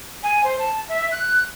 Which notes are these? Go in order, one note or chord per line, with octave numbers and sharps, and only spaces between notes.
G#5
C5
A5
E5
F#6